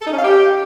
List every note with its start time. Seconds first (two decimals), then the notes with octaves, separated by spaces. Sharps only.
0.01 A4
0.07 D#4
0.13 C#4
0.19 F5
0.25 G4